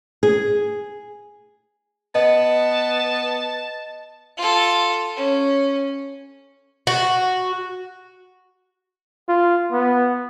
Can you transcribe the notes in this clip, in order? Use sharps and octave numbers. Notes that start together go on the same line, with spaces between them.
G#4
B3 D#5 A5
F4 A4
C#4
F#4
F4
B3